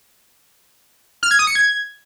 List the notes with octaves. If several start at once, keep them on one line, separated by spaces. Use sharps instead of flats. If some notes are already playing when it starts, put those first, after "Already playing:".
F6
G#6
D#6
C#7
G#6